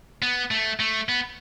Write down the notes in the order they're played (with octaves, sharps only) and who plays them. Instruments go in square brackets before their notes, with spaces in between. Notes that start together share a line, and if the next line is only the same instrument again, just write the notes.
[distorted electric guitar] B3
A3
A3
B3